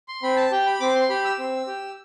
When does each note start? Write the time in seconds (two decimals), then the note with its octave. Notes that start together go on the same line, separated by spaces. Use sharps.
0.08 C6
0.23 C4 B5
0.36 A5
0.51 G4 G5
0.66 B5
0.80 C4 D6
0.95 C6
1.10 G4 B5
1.25 E6
1.39 C4
1.67 G4